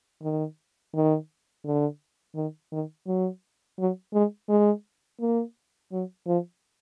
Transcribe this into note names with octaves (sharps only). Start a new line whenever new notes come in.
D#3
D#3
D3
D#3
D#3
F#3
F#3
G#3
G#3
A#3
F#3
F3